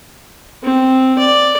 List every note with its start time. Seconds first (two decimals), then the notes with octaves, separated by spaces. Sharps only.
0.63 C4
1.18 D5